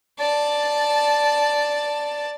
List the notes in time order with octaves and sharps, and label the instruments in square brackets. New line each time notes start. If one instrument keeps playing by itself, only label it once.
[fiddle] D5 A5